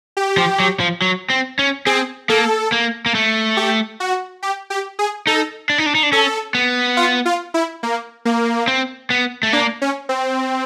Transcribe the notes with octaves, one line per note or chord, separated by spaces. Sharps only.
G4
F3
F#3
F3
F#3
C4
C#4
C4 G#4
A#3 A4
A#3
A#3
A3
G4
F#4
G4
G4
G#4
D#4 A4
D4
D#4
D4
D#4
D4
C#4 A4
B3
F4
F4
E4
A#3
A#3
C4
B3
A3
A#3 D4
C#4
C4